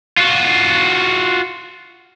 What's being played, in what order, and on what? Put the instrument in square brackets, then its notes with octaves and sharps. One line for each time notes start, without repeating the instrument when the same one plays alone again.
[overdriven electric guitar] F4 F#4